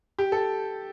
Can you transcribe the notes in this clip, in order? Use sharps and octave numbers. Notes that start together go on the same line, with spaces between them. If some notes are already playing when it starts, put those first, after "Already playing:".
G4
A4